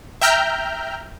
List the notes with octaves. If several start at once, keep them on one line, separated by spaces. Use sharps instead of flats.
E5 G5 A#5 F6 G6